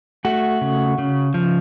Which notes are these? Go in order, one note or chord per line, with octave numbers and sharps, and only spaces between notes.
A3 F#4
C#3
C#3
F3